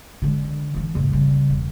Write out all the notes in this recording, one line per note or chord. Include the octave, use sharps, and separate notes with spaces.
D3 G#3
E3 F3
F#1 A2
C#3 G3
E1